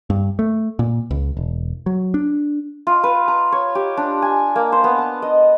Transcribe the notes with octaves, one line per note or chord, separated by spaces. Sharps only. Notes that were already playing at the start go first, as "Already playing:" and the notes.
G2
A3
A#2
C#2
E1
F#3
D4
F4
B4
A#5
C#5
G4
D4
G#5
A#3
C5
B3
A5
D#5